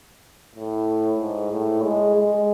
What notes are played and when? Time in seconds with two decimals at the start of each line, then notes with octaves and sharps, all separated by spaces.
0.55 A2
1.19 G#2
1.51 A2
1.83 G#3
2.15 G#3